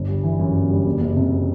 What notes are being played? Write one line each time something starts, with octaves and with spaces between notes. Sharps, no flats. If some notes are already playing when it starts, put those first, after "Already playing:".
Already playing: G1
G3
E3
F#2
G1
G3
F#1
F#1
C3